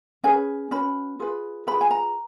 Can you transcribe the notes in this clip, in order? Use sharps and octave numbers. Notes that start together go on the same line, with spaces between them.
C#4 G#4 B4 G#5
C#4 F#4 B4 B5
F4 G#4 B4
F4 G#4 B4 B5
G#5
A#5